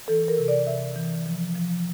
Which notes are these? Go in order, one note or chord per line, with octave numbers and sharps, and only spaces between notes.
E3 A4
A#4
C3
D5
C3 E5
E3
F3
F3